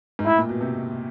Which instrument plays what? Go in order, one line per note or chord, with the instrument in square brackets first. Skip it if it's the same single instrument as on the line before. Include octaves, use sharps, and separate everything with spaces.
[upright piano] G#2
[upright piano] A2 [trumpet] E4
[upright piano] A#2
B2
C3